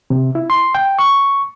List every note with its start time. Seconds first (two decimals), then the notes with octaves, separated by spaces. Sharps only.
0.10 C3
0.35 E4
0.50 C6
0.75 G5
0.99 C#6